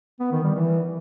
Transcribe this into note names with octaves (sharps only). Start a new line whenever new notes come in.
B3
D#3
G3
E3